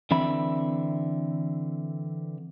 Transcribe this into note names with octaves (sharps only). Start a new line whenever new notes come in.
D3 E3 C4 E5 B5